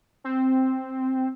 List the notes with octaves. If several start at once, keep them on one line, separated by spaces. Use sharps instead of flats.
C4